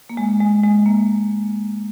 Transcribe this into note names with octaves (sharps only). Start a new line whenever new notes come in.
A#3
G#3
G#3
G#3
A#3